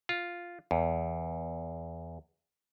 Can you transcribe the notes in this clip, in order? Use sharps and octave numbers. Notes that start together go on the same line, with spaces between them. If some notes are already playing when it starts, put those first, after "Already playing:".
F4
E2